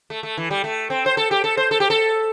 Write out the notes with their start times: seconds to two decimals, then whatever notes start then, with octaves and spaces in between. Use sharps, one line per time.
0.10 A3
0.23 A3
0.37 E3
0.51 G3
0.64 A3
0.90 C4
1.06 C5
1.17 A4
1.31 G4
1.44 A4
1.57 C5
1.71 A4
1.80 G4
1.90 A4